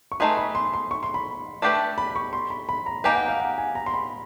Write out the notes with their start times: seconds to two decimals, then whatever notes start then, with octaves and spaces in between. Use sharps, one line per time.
0.12 C#6
0.20 A3 C4 D#4 G#4 B4 C6
0.37 B5
0.55 C6
0.74 C6
0.91 C#6
1.03 C6
1.14 B5
1.62 A3 D4 G4 B4
1.98 B5
2.16 C#6
2.33 C6
2.50 B5
2.69 B5
2.86 A#5
3.04 A#3 D#4 G4 B4 G#5
3.16 F#5
3.28 F5
3.40 F#5
3.58 G#5
3.75 A#5
3.86 C6
3.94 B5